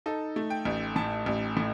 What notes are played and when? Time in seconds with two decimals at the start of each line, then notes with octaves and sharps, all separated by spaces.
0.06 D#4 A4
0.36 A3
0.50 G5
0.65 A1
0.96 A2 A5
1.26 A1
1.57 A2